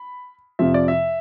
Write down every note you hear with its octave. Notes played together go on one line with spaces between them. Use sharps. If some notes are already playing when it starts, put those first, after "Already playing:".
Already playing: B5
F2 C3 F3 E5
D5
E5